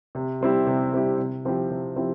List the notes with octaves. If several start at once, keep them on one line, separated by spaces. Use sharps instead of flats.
C3
G3 C4 E4 G4
C3
G3 C4 E4 G4
C3
F3 C4 E4 G4
C3
F3 C4 E4 G4